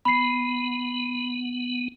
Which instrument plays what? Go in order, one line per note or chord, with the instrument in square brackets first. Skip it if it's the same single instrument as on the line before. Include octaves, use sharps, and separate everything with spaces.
[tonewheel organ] B3 [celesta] B5 C7